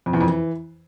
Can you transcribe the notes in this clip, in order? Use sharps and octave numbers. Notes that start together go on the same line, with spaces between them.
F2
E2
F2
E3